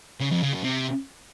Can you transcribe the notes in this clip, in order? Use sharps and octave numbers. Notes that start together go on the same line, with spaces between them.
C#3
F2
C#3
F#2
C3